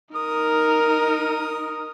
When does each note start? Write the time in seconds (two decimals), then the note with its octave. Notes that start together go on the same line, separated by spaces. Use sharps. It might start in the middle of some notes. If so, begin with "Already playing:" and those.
0.15 D#4 A#4 D#6